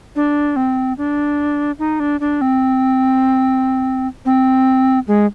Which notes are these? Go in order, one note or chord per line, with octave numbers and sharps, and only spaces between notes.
D4
C4
D4
D#4
D4
D4
C4
C4
G#3